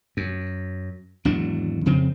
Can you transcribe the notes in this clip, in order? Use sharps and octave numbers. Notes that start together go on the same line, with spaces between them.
F#2
G#1 E2 F#3 D4
F2 C#3 C4